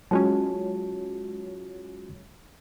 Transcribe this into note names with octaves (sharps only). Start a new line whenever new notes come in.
F#3 G#3 C#4 F4 F#4 A5